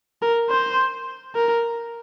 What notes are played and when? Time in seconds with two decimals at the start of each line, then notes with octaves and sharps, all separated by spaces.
0.22 A#4
0.50 C5
1.35 A#4